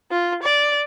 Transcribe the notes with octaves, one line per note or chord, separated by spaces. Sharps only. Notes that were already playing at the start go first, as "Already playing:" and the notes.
F4
D5